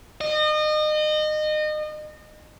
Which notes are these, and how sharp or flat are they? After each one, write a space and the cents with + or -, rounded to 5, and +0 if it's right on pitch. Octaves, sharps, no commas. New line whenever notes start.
D#5 -30